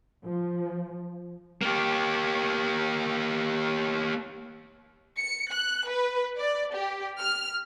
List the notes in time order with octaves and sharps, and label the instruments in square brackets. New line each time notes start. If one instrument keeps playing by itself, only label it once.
[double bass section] F3
[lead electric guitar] A#3 G4
[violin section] C#7
F#6
B4
D5
G4
F6